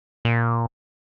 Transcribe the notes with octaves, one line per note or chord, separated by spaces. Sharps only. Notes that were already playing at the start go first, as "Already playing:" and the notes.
A#2